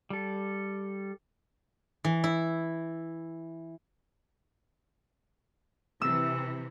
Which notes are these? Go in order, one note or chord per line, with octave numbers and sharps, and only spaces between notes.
G3 A4
E3
E4
C3 E3 E6